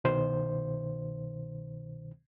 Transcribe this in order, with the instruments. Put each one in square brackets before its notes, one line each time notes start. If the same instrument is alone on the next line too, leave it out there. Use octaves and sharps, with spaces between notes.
[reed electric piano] C2 B2 D#3 C5